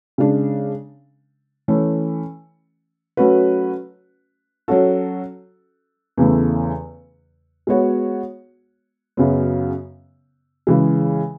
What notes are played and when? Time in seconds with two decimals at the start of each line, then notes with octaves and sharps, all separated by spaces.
0.18 C#3 G#3 D4
1.68 E3 A3 C#4
3.17 F#3 A3 C#4 F#4 B4
4.68 F#3 C#4 F#4 A4
6.17 E2 C#3 E3 A3
7.67 G#3 B3 F#4 C#5
9.17 F#2 C#3 F#3 B3
10.67 C#3 E3 G#3